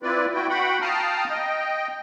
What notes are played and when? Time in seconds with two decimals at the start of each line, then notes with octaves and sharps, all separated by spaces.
0.03 C4 E4 F4 B4 D5
0.34 E4 F#4 G5
0.50 F#4 F#5 G5 B5
0.81 F5 G5 A5 A#5 D#6 F6
1.30 D#5 G5